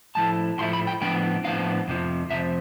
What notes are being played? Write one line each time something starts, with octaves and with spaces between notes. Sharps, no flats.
A2 F3 A3 E4 A5
A2 F3 A3 E4 C6
B5
G5
A2 F3 B3 D4 G5
A2 F3 B3 D4 F5
F2 C3 F3
F2 C3 F3 E5